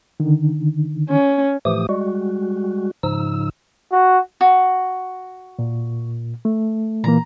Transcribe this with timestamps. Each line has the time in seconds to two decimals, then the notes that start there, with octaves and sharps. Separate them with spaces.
0.20 D3 D#3
1.09 C#4
1.65 A2 E3 F3 A3 G4 D#6
1.89 G3 G#3 F#4
3.03 G#2 C#3 F3 D#4 E6
3.92 F#4
4.41 F#4
5.59 A#2
6.45 A3
7.04 A#2 E3 A#3 A#5